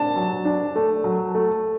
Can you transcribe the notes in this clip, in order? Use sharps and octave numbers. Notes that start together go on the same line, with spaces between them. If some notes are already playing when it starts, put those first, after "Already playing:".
Already playing: D4 A5
F#3
D4
A3
F#3
A3